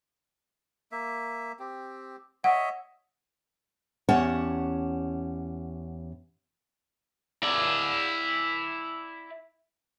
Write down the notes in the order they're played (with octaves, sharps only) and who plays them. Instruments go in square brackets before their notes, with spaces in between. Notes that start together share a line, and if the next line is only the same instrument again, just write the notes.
[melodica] A#3 E5
C4 G4
[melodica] C#5 D#5 E5 [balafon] F#5
[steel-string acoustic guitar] E2 C#4 G4 C#5 F#5 A5
[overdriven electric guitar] E4 D5